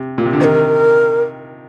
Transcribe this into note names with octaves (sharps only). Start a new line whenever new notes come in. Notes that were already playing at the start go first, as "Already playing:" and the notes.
Already playing: C3
A#2
C3
D3
C3 D#3 A#4 C5